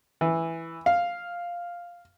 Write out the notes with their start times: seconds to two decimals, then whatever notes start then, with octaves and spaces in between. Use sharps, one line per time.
0.21 E3
0.86 F5